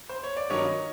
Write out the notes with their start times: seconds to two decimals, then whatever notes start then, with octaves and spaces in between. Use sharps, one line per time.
0.09 C5
0.23 C#5
0.37 D5
0.50 G2 D#3 F#3 A#3 C#4 C#5 D#5